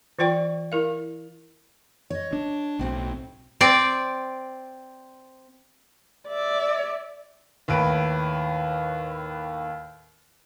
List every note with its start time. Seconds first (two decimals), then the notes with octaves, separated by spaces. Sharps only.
0.19 E3 F4 C5 D5 G5 C#6
0.72 E4 A#4 F5
2.10 C#5 D#5
2.33 D4
2.79 B1 A2 C4 F#4
3.61 C4 D5
6.29 D5 E5
7.68 D#2 A2 B4 D7